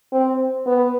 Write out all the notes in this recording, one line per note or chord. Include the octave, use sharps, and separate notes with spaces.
C4
B3